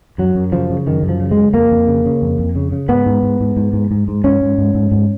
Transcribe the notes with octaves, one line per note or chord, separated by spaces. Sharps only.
F#2 F#3
F#2
C#3 F3
C#3
F#2 D#3
F#2
F3
C#3
G#3
C#3
F2 A#3
F2
C#3
C#3
F2
F2
C#3
C#3
G#2 B3
G#2
G#2
G#2
G#2
G#2
G#2
G#2
G#2 C#4
G#2
G#2
G#2
G#2